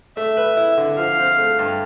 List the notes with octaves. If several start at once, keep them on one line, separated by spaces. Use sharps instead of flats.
A3 E5
B4
E4
D3
F3 F5
C4
A3
G2